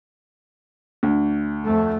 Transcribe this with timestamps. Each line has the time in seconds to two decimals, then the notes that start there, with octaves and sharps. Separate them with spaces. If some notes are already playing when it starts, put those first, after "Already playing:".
1.03 D2
1.64 F2 A3